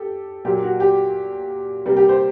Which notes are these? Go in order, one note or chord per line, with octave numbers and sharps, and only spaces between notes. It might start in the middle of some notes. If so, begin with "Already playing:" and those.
Already playing: G4 A4
A#2 F#3 A#3 G4
F#4
G4
C3 G3 A#3
G4
C5